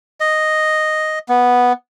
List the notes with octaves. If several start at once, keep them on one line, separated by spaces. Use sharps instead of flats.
D#5
B3